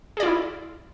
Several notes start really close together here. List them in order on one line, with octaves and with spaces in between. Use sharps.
G#4 D5 F4 E4